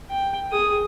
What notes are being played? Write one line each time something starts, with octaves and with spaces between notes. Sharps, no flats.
G5
G#4 D#6